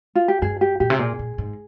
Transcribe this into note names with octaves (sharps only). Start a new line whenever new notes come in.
F4
G4
G2 G#4
G4
A#2 G4
C3
A#2 G#4
A#2
G#2